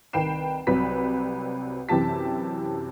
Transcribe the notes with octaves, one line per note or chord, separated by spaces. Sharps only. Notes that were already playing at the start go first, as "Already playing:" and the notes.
C2 D#3 B4 G5 C7 E7
C2 C3 F#3 B4 B6
F#2 C3 E3 G4 A5 B6